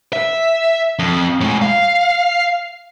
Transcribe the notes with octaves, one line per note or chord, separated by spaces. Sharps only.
E5
F2
A2 G#3
F5